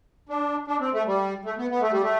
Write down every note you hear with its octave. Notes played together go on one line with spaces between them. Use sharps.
D4
D4
C4
A3
G3
A3
B3
B3
A3
G3
A3